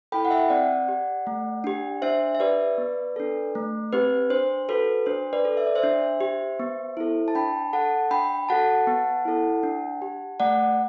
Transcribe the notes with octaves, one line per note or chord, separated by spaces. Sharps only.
E4 A4 G5 B5
F#5
E5 G5
C4 D5 F#5
G4
A3
D4 G4
D4 C5 E5
E5
G4 B4 D5
B3
D4 A4
A3
C4 G4 B4
D4 C5
F#4 A4 B4
D4 C5
B4 D5
A4
E5
D5
C5 E5
D4
G4
B3
E4 A4
A5
D4 G5 B5
A4 F#5 A5
D4 G5 B5
F#4 A4 F#5 A5
B3
E4 A4
D4
G4
A3 D5 F#5